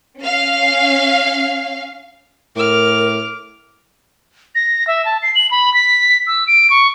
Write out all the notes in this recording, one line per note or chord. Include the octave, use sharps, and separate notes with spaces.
C#4 F5
A2 A#4 D6 F6
A#6
E5
A5
C7
F#7
B5
B6
E6
D7
C#6